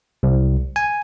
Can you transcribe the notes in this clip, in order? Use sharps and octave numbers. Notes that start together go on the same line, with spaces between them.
C2
G#5